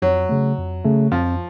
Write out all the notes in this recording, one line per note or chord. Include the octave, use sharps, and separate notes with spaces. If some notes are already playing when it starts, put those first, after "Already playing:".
F2 F#3
C#3 A3
F2
C#3 A3
F2 F3